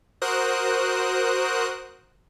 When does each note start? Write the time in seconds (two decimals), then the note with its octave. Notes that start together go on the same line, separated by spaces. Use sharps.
0.22 F#4 A#4 C5 D#6 F#6